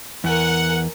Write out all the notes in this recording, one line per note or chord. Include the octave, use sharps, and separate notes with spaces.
E2 A#4 F#5 G#5